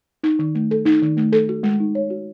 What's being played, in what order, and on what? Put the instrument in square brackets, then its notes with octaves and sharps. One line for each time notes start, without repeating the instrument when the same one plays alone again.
[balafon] D#4
D#3
A3
A4
D#4
D#3
A3
A4
F#4
G#3
D#4
C#5
F#4